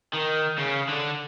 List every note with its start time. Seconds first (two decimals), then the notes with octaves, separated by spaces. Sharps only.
0.13 D#3
0.58 C#3
0.89 D3